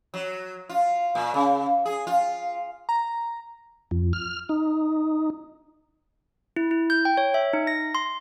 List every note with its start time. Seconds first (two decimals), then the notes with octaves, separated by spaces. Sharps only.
0.14 F#3
0.69 F4
1.15 A#2
1.34 C#3
1.86 G#4
2.07 F4
2.89 A#5
3.91 F2
4.13 F6
4.49 D#4
6.56 E4
6.71 E4
6.90 G6
7.05 G5
7.17 C#5
7.34 E5
7.53 D#4
7.67 A#6
7.95 C6